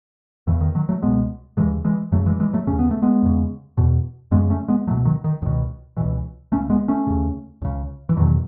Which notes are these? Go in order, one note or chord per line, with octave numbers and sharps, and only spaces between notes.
E2 C#3 E3
D#3
D#3 F#3
F#3 A3
C#2 B2 G#3 B3
D#2 C#3 E3 G#3
E3 G#3
F#2 C#3 F#3 A3
E3 G#3
E3 G#3
F#3 A3
D#2 C#3 C#4
B3
A3
G#3 B3
E2 C#3
E2 B2
F#2 C#3 G#3 B3
A3 C#4
G#3 B3
C#2 B2 F#3 A3
D#3 F#3
D#3
C#2 B2 D#3
C#2 B2 E3
C#2 C#3 A3 C#4
G#3 B3
A3 C#4
D#2 C#3
C#2 C#3
E3
E2 B2 D#3 F#3